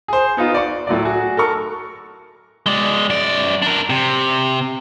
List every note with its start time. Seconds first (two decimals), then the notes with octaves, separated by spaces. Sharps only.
0.08 G#4 C5
0.37 B3 D#4 F4
0.54 D5 C#6
0.87 A2 F#3 D5
1.05 F#4 G#4
1.37 A4 A#4 C#6
2.66 G#3 D5
3.10 F#2 D5
3.62 D4 A#4
3.90 C3